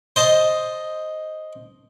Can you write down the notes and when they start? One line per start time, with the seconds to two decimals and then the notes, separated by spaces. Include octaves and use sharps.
0.16 C5 D#5 A5